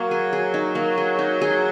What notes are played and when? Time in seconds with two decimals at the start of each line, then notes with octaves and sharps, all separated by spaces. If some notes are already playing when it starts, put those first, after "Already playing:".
Already playing: F#3 A#3
0.11 G#4
0.33 G#4
0.54 D#4
0.75 A#3
0.98 G#4
1.19 D#4
1.41 G#4